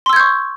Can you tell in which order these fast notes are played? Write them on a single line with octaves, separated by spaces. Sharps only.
C6 E6 G#6 G6 C#6